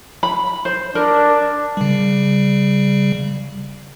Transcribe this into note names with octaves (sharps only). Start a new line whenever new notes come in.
B5
C5
D4 A#4
C#3 G3